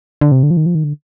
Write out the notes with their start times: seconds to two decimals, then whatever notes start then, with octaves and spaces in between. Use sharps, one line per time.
0.21 D3
0.32 C3
0.43 D3
0.51 F3
0.57 D#3
0.66 F3
0.75 D#3
0.84 D3